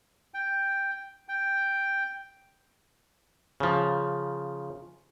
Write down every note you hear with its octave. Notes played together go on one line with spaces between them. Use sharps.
G5
G5
C#3 F3